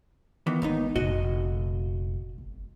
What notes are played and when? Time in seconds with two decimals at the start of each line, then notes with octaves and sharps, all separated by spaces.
0.47 D#3 E3 B3
0.62 G#1 D#2 G#3 B3 D#4
0.96 F1 A#2 F#4 D#5
2.38 G#1